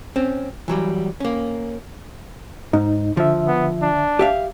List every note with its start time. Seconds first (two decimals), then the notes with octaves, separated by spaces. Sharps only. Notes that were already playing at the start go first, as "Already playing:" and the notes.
0.16 C4 C#4
0.68 E3 F#3 G3
1.20 A#3 C#4
2.73 G#2 D#4
3.17 D3 F3 E5
3.47 B3
3.82 D4
4.19 G4 E5 F5